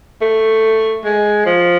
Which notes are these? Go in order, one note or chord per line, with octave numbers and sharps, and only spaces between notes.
A3
G#3
F3